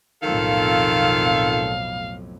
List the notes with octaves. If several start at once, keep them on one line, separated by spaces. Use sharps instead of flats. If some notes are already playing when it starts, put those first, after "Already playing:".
B1 F2 A2 D#3 F4 A4 F5